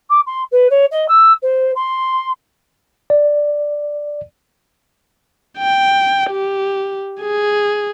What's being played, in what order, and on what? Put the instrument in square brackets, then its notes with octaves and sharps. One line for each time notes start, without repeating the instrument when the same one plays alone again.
[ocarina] D6
C6
B4
C#5
D#5
E6
C5
C6
[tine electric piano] D5
[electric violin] G5
G4
G#4